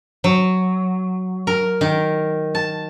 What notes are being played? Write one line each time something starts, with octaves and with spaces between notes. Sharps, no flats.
F#3
A#4
D#3
A5